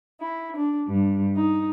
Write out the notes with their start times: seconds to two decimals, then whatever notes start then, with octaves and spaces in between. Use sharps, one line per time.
0.20 E4
0.56 D4
0.88 G2
1.35 D#4